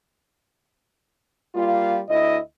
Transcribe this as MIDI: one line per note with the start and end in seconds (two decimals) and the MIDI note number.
1.55 2.01 55
1.55 2.01 58
1.55 2.01 65
2.09 2.38 38
2.09 2.38 64
2.09 2.38 75